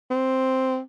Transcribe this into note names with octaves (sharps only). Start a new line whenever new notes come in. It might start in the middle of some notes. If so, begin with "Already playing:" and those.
C4